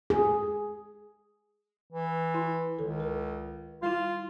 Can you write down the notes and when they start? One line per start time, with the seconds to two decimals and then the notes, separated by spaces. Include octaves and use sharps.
0.10 G#4
1.91 E3
2.34 E4 C6
2.79 C#2 D#3 A4
3.00 A#4
3.82 G3 E4 F4